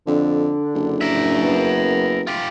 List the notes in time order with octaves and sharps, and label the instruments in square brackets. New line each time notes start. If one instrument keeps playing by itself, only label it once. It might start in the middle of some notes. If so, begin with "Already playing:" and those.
[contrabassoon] F2 [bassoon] D3 [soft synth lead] D4
[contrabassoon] F#1
[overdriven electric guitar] A#4 E5
[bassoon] B3
[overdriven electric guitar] F4 G4